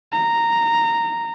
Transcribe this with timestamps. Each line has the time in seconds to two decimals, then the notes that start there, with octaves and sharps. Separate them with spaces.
0.12 A#5